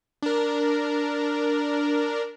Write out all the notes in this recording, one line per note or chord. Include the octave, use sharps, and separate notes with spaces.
D4 A#4